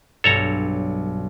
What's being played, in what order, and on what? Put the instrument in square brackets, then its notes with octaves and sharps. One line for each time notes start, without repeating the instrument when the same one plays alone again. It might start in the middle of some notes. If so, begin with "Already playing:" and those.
[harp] B1 G2 [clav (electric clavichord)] A4 C#5 A#5